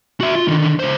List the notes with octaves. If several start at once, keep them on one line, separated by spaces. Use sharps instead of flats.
F#4 E5
F4
D3 D#3
C#2 C5